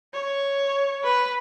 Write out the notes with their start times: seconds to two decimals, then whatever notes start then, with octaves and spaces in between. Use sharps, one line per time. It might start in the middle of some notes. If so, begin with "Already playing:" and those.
0.13 C#5
1.04 B4